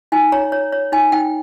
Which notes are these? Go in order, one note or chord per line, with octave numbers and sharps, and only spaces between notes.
D#4 G#5
C#5 A#5
C#5
C#5
D#4 G#5
D#4 G5